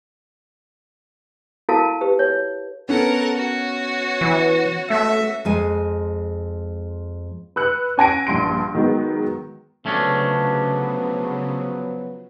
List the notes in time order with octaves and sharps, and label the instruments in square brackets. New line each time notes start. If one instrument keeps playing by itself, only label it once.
[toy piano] E4 F#4 A4 A#4 F5 A5
G4 B4
C#5
[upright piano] B3 C#4 [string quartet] A4 A#4 F#5
[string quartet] F#4 C#5
[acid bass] E3
[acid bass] A3 [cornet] E5
[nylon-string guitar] F2 G#3 G#5
[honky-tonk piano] B4 E6 F#6 C#7
C#4 G#5 A#6 D7
A#1 G2 C6 D7
D#3 F#3 G#3 B3
[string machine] C#3 [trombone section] F3 F#3 B3 [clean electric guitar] A3 C#4 D4